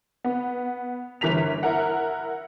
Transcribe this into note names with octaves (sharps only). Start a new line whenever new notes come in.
B3
G1 E3 A#4 B6 F7
E4 A#4 F#5